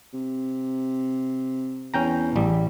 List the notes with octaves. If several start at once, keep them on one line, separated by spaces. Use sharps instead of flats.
C3
E2 C#4 G5 A#5
A1 G3